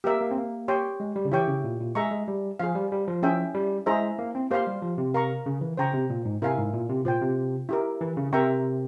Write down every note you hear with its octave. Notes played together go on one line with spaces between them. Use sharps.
A#3 G4 A#4 E5
A#3
C4
A#3
G4 C#5 G5 C6
G#3
G3
C#3
E3 E4 G4 C#5 G5 C#6
C#3
A#2
A#2
G#3 G#4 E5 A#5 C#6
G#3
G3
F3 G#4 C5 F5
G3
G3
F3
C#4 E4 G#4 E5 G5
G3
G#3 E4 G#4 C5 E5 A#5
A#3
C4
A#3 G4 C5 F5 C6
G3
F3
C3
A#4 F5 A#5 C#6
C#3
E3
C#3 C5 G5 A#5 C#6
C3
A#2
G#2
C3 E4 A#4 F5 G#5
G#2
A#2
C3
A#2 F4 C5 G5
C3
E4 G4 A#4
E3
C#3
C3 A#4 E5 G5 A#5 C#6